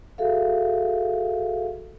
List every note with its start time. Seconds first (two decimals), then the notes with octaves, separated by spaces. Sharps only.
0.18 F#4 G#4 A4 E5 F5